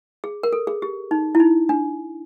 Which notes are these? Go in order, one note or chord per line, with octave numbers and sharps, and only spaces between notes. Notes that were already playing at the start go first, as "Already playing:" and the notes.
G#4
A#4
A4
G#4
G4
D#4
E4
D#4
D4